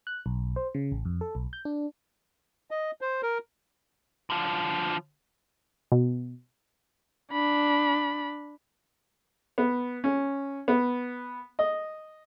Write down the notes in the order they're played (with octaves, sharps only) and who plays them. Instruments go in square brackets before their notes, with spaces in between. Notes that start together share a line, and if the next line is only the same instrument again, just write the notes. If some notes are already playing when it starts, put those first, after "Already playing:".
[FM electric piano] F#6
B1
C5
C#3
A1
F2
A4
B1
G6
D4
[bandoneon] D#5
C5
A#4
[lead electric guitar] D3 F3
[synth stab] B2
[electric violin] D4 B5
[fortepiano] B3
C#4
B3
D#5